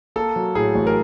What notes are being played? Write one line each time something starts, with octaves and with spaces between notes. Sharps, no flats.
A#3 A4
F#3
A2 G#4
A1
A#4